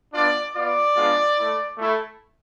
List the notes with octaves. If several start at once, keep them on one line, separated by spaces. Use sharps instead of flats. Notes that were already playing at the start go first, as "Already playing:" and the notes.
B3 D4 F4 D5
B3 F4 D5
G#3 B3 D4 F4
A3 E4
A3 E4